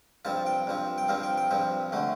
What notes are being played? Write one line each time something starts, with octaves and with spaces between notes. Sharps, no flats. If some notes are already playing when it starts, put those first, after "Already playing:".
G2 F3 C4 A5
G5
G2 F3 C4
G5
G2 F3 C4 F5
G5
G5
G2 F3 C4
D3 A3